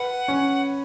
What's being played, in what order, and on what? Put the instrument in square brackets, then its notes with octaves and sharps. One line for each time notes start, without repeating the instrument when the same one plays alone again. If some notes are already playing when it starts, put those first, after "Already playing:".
Already playing: [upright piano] B4 [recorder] F#5
[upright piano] C#4